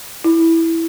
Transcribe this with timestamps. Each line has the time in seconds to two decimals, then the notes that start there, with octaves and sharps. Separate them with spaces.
0.24 E4